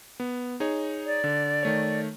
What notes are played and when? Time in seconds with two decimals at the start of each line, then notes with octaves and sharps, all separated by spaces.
0.20 B3
0.60 D#4 G#4 C#5
1.06 D5
1.24 D3
1.63 D#3 A3 C#5